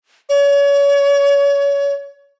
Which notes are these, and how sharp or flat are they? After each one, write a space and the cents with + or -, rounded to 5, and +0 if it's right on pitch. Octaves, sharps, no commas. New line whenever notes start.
C#5 +30